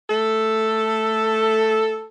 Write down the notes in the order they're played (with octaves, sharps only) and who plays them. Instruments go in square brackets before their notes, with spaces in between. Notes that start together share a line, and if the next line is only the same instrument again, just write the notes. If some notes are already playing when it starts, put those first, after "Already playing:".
[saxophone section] A3 A4